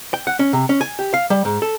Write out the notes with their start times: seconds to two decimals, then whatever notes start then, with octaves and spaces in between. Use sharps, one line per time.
0.14 G5
0.27 F#5
0.39 C#4
0.53 C3
0.69 C#4
0.81 G#5
0.99 G4
1.14 F5
1.30 G3
1.45 G#2
1.62 A4